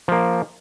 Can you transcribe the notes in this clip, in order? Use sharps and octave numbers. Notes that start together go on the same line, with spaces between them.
F3 A#3